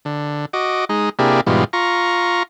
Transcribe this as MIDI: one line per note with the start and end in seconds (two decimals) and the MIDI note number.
0.05 0.46 50
0.53 0.85 66
0.53 0.85 75
0.53 0.85 86
0.89 1.09 56
0.89 1.09 63
1.19 1.41 48
1.19 1.41 58
1.19 1.41 62
1.19 1.41 64
1.19 1.41 67
1.19 1.41 68
1.47 1.64 44
1.47 1.64 47
1.47 1.64 52
1.47 1.64 55
1.47 1.64 65
1.73 2.43 65
1.73 2.43 82
1.73 2.43 85